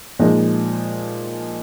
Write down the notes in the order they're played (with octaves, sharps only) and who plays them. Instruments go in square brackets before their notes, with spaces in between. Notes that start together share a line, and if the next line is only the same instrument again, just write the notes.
[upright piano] A#2 F3 G#3 D#4